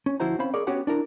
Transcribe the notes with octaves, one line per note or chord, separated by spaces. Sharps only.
C#4
D2 F3 E4 F#4 C5 A#5
C4 C#4 C5 F5 B5
G#4 A#4 C#5 D5
B3 C#4 F#4 G4 C#5 F#5
D4 E4 A#4